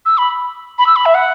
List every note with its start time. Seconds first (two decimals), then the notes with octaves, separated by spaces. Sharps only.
0.06 E6
0.18 B5
0.78 B5
0.87 E6
0.96 B5
1.06 E5
1.14 F#5